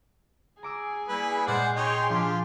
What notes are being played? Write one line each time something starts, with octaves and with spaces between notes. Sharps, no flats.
G#4 G#5 A#5 D6 E6
G3 A#3 E4 B4
A#2 G#3 C5 D5 F#5 F6 C7
D#4 G#4 C#5 G5 C6
F3 D4 F4 G4